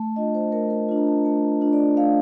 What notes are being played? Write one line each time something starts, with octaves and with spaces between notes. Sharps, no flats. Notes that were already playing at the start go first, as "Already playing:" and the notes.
Already playing: A3 A5
D4 F4 D#5
C5
A3 A#4
A#4
D4 F4
A#5
A5
A3 A5
D4 F4
D5
A3 F5